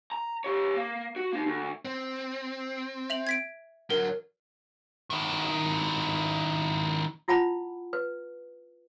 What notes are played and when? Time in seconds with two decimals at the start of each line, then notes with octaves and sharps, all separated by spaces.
0.12 A#5
0.44 G4 C#5
0.76 A#3
1.16 F#4
1.33 A#3 D#4
1.46 D2
1.85 C4
3.10 E5 F7 F#7
3.27 G#6 B6 D7
3.90 D3 F#3 A#4
5.10 D#3 E4
7.28 E4 F4 F#5 A5 B5
7.93 B4